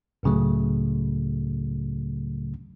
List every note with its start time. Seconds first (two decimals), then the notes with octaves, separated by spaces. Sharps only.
0.23 C#2 A2 C#3 F#3 A3